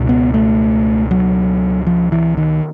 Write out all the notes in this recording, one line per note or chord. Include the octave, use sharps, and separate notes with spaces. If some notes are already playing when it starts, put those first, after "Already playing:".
Already playing: C#2 B2
B3
A3
F#3
F3
E3
D#3